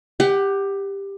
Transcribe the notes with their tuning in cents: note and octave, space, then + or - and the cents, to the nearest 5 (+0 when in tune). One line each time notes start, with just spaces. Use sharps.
G4 +15 F#5 +40